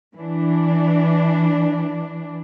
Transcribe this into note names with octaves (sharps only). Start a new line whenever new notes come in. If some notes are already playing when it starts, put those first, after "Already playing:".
E3 D4